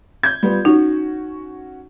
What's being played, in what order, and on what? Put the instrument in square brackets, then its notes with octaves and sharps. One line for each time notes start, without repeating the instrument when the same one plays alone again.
[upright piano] G6 G#6
G3 B3 F4
[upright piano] C#4 F#4 [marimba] D#4